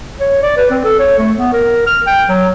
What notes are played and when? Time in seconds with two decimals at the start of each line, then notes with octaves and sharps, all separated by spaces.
0.20 C#5
0.42 D5
0.57 B4
0.70 C4
0.84 A4
0.99 C#5
1.18 A3
1.37 B3
1.53 A#4
1.86 F6
2.07 G5
2.28 F#3